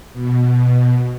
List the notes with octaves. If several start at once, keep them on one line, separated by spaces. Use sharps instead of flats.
B2